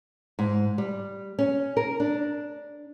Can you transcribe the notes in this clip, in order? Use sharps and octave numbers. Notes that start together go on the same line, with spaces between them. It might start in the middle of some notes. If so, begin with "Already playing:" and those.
G#2
G3
C#4
A#4
D4